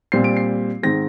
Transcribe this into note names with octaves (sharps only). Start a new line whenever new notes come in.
A#2 G3 C4 C7
D7
C7
G#2 D#3 G#3 C4 A#6